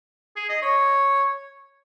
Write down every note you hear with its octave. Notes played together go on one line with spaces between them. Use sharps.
G#4
D#5
C#5